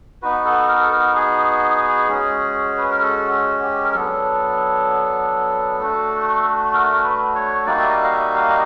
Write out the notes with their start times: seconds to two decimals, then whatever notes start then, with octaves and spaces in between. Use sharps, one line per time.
0.22 B3 D#4 F#4 B4
0.45 A4
0.68 A#4
0.81 A4
0.92 A#4
1.16 G#4
2.08 G#3 C#4 F#4
2.77 B4
2.90 A#4
3.02 A4
3.32 F#4
3.63 G4
3.83 A#4
3.94 F#3 B3 D4 A4
5.80 A3 D4 F#4
6.74 A#4
7.03 B4
7.35 C#5
7.66 G3 A#3 D#4 F#4 D5
7.79 E5
7.90 D#5
8.04 F5
8.13 E5
8.35 F5
8.50 D#5